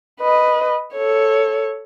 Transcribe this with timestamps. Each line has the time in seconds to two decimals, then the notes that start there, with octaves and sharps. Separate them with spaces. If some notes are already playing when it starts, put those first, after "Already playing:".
0.20 B4 D#5
0.93 A4 C#5